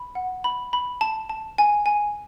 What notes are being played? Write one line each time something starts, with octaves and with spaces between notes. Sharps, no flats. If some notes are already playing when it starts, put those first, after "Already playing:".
Already playing: B5
F#5
B5
B5
A5
A5
G#5
G#5